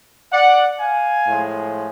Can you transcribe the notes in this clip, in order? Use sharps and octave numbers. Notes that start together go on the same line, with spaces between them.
D5 F#5
F5 G#5
A2 F3 G#3